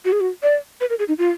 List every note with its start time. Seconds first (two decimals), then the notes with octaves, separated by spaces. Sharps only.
0.05 F#4
0.12 G#4
0.20 F#4
0.43 D5
0.81 B4
0.90 A#4
0.99 G#4
1.08 D#4
1.18 F4